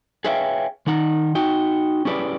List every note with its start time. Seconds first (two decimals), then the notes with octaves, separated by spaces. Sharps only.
0.25 G#4 B4 C#5 E5 F5 G5
0.87 D#3 D#4 F#5 A#5
1.35 D#4 F#4 G5
2.05 C#4 E4 G4 G#4 B4 D5